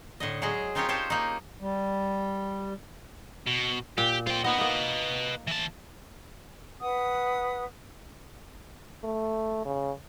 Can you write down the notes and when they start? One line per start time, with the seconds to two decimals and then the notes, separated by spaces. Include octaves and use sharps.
0.20 A2 D3 D#5
0.42 F#3 G#3 G#4 D#5
0.75 C4 D#4 F4 G4 A#4 C#5
0.89 D#4 G4 C5 C#5 G5 A5
1.10 A#3 D#4
1.60 G3
3.47 B2
3.98 A#2 G4
4.27 F4 C5 G5
4.44 B3 D#4 B4 D#5
4.58 A#3 D#4
5.47 E3 A5
6.80 B4 F#5 D#6
9.04 A3
9.65 C#3